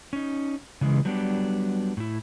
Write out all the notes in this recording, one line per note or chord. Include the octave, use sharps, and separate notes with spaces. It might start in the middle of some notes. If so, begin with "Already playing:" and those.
C#4 D#4
C#3 E3 G#3
F#3 G3 A3 B3 D4 G4
A2 E4